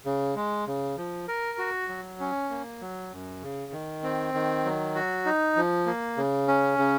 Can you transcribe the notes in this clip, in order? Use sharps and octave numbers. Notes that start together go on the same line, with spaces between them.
C#3
G#3
C#3
F3
A#4
F#4
F#3
C#4
A#3
F#3
F#2
C#3
D#3
C4
D#3
F#3
F#4
D#4
F3
A#3
C#3
C#4
C#3